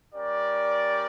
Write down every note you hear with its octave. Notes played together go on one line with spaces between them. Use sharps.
G3 C#4 G4 A#4 D5